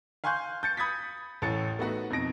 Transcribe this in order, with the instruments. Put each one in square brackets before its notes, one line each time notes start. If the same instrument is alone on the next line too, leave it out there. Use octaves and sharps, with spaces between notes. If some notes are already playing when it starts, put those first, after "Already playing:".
[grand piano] F5 G#5 C6 C#6 F#6 G6
G6 A6 C#7
B5 D#6 G#6 A6 B6
A1 A2 A4 A6 C#7
A3 B3 D#4 F#4 F#5
F2 B2 D#4 A#6 D7